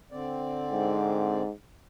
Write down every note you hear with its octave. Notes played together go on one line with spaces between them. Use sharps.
D3 C4 D5
G#2